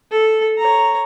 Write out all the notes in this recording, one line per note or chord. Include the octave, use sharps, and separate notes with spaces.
A4
C#5 A#5